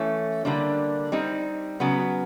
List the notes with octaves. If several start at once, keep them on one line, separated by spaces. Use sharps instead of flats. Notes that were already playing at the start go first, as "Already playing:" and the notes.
Already playing: E3 A3 C#4
D3 G3 A#3 D4
G3 C4 D#4
C#3 F#3 B3